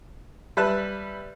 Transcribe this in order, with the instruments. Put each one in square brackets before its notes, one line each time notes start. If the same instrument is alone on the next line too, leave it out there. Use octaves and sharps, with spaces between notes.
[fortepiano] G3 B4 E5 A5 F#6